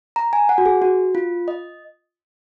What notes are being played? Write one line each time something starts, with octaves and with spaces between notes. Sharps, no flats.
A#5
G#5
F#5
F#4
G#4
F#4
F4
D#5